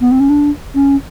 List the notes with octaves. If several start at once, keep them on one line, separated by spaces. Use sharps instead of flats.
B3
C4
C#4
D4
C#4